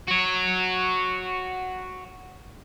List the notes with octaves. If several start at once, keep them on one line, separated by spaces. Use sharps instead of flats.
F#4 C#5